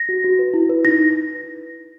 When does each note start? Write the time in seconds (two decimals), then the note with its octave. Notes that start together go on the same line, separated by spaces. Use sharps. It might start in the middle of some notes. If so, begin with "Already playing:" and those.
Already playing: A#6
0.09 F#4
0.24 F#4
0.39 B4
0.54 E4
0.70 B4
0.85 D#4 A#6